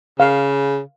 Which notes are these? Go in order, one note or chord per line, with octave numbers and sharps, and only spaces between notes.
C#3 F5